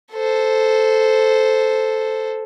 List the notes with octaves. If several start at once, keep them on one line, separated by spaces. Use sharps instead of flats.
A4 C5